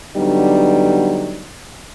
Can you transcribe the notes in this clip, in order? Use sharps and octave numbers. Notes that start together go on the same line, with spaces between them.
D3 F#3 G3 B3 D4 D#4